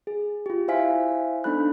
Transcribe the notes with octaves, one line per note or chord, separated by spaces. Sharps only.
G#4
F4 G4
E4 C5 E5 F5 G#5 B6
B3 D4 D#4 A4 B5 F#6